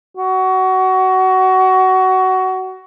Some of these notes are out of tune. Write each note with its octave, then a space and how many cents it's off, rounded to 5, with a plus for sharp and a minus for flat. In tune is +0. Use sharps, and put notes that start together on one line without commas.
F#4 +20